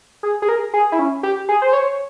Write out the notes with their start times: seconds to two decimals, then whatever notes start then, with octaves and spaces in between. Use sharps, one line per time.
0.23 G#4
0.42 G#4
0.49 A#4
0.74 G#4
0.92 E4
0.99 C#4
1.23 G4
1.49 G#4
1.62 C5
1.73 C#5